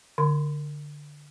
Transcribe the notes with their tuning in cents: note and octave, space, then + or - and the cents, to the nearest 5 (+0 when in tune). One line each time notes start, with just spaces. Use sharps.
D3 +0 C6 +0